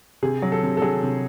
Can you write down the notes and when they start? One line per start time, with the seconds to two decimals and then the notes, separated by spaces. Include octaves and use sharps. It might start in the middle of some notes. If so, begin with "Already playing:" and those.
0.23 C3 G#4
0.42 F#3
0.52 A4
0.63 C3
0.77 A4
0.82 F#3 G#4
1.03 C3